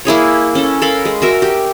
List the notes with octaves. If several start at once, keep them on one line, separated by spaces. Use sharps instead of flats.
A#3 E4 G#4 C#5
C#4 A4
A4 A#4 F5 B5
G#3
F#4 A#4 E5
G4